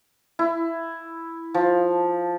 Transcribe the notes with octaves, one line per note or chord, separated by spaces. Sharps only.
E4
F3